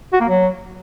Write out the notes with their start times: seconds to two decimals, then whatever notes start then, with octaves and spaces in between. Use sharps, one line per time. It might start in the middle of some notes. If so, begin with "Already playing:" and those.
0.13 F#4
0.21 A#3
0.28 F#3